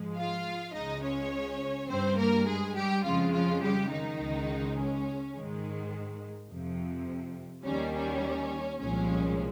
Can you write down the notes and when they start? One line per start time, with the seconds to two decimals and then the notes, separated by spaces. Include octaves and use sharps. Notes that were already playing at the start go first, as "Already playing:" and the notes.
Already playing: G#2 F3 G#3
0.16 F4 F5
0.73 C#2 C#3 G#3 D#4 D#5
1.02 C#4 C#5
1.89 G2 G3 C4 C5
2.17 A#3 A#4
2.46 G#3 G#4
2.76 G3 G4
3.04 F2 C#3 F3 G#3 F4
3.33 F3 F4
3.62 G3 G4
3.90 D#3 D#4
4.19 C#2 C#3 G#3
4.77 C#4
5.34 G#2 D#3 G#3
6.50 F2 C3 F3
7.65 D#2 D#3 G3 C#4
7.94 C#4
8.80 C2 A#2 F3 G#3 C#4